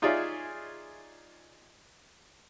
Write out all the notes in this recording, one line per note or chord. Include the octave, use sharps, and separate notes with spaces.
D#4 F4 G#4 C#5 D5 E5